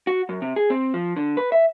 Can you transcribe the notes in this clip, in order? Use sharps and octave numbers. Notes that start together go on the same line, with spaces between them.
F#4
F#2
C3
G#4
C4
F3
D3
B4
E5